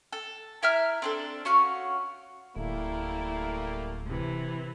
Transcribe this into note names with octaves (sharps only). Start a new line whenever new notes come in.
A4
E4 E5 A#5 F6
C4 D4 A4
C#4 F#4 F5
D1 G3 A3 A#3 E4
C3 E3